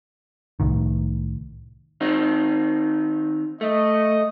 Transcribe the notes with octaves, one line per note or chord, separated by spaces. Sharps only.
C2 A2 D#3
D#3 C4 D#4
A3 D#5